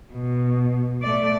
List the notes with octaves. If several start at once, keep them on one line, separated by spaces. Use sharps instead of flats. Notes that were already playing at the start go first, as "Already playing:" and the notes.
B2
A3 D5